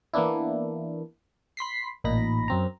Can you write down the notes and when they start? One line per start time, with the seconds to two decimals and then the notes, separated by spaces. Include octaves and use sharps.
0.14 E3 A#3 B3 D4 E4
1.57 B5 C6 B6 C7
2.04 A1 A#2 D#4 B5 A#6
2.48 F#2 C4 A#5